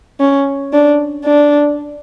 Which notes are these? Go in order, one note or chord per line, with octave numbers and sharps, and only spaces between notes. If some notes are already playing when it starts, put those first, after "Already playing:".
C#4
D4
D4